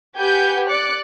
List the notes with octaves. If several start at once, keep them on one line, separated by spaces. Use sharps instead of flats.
G4 B4 F#5 G#5 G6
D5 D6 F#6 C#7